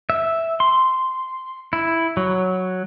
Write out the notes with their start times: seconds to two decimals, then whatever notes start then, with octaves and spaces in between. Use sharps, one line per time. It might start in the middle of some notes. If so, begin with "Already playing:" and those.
0.10 E5
0.60 C6
1.73 E4
2.17 F#3